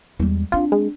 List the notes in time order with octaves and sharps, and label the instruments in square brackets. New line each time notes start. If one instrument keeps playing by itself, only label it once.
[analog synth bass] E2 [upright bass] G3 G#3
[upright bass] C4 D4 [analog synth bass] F4
[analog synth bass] G#3